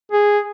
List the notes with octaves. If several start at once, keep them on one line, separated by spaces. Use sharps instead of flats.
G#4